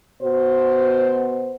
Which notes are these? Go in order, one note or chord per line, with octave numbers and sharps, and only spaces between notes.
B2 F#4 C5